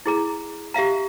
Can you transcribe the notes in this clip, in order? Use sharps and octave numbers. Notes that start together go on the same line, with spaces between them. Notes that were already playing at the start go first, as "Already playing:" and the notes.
E4 G#4 A#5
G4 E5 F5 A#5